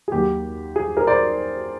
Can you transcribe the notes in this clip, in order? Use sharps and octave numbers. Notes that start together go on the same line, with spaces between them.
G#4
D#2 D#3 F#3 G4
G#4
G#4 A#4
C5 D5